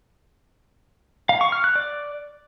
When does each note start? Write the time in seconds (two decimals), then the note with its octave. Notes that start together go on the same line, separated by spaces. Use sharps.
1.29 F5
1.41 C#6
1.52 F6
1.64 F#6
1.76 D5